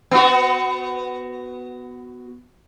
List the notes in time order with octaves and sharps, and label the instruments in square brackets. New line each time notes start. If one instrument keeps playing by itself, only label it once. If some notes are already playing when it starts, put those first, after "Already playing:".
[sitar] B3 F#4